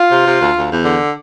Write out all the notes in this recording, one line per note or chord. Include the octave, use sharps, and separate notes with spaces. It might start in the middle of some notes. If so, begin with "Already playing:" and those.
Already playing: F4
C3
C3
D2
D2
E2
D3